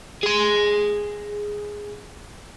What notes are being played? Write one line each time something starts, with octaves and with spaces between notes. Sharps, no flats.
G#4 C6